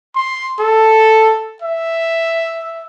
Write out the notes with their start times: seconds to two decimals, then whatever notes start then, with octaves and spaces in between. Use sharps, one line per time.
0.15 C6
0.59 A4
1.62 E5